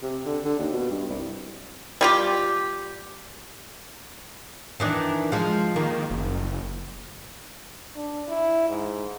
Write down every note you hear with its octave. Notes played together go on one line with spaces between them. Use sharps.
C3
D3
D3
D#2
B2
G2
C2
G3 F4 G4
D#3 E3 D4
F3 G#3
D#3 A#3
F#1
D4
E4
G#2